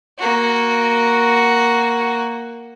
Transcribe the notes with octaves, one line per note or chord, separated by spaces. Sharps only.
A#3 F#4